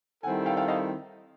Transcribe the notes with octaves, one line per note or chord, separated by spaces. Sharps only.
D#3 G3 C4 E4 A4 F#5 G#5
F5 G5
F5 G5
D#5 F5